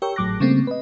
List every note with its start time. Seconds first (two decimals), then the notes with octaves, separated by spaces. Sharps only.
0.02 G4 A#4 C#5 G5 C#6 E6
0.16 G#1 A2 F#3 D6 F#6 A#6
0.40 C#3 G3 A3 A#3 C4
0.67 B4 D#5